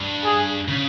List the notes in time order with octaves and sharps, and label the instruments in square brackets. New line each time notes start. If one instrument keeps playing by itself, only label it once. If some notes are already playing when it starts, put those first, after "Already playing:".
Already playing: [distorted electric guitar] G2
[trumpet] G#4
[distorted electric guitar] C#3